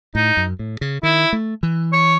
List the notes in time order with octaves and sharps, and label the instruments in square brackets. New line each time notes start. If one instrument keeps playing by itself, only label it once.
[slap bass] A2 [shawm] D#4
[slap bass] F#2
A2
C#3
[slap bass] D#3 [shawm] E4
[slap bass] A3
E3
[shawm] C#5